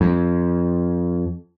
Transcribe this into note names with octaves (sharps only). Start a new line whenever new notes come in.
F2